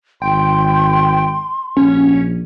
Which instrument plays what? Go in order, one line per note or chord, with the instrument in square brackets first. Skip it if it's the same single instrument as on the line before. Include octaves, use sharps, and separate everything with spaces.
[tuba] G#1 [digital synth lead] G5 [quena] C6
[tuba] A#1 [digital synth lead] C#4